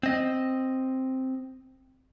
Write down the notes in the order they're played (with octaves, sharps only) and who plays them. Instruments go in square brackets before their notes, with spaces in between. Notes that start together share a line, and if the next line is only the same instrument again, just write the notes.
[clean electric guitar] C4 D#5